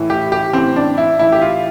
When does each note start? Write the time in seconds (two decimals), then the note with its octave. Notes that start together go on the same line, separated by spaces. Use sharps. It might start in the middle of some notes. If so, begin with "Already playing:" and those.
Already playing: A2 E3
0.10 G4
0.32 G4
0.53 A2 E3 C4
0.76 D4
0.98 E4
1.19 A2 E3 E4
1.32 G4
1.42 F4